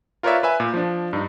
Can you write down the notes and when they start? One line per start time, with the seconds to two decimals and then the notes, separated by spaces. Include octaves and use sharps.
0.23 F4 A#4 B4 C#5 D5 E5
0.43 B4 E5 G#5
0.60 A#2
0.74 F3 D4
1.13 G2 D#4